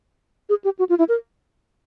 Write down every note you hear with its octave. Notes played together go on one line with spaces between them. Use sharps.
G#4
G4
F#4
F4
E4
A#4